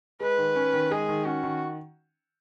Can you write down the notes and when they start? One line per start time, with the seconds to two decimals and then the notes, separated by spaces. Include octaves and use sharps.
0.20 G#3 B4
0.38 D#3
0.56 C#4
0.73 D#3
0.91 G#3 G#4
1.09 D#3
1.26 C#4 F#4
1.43 D#3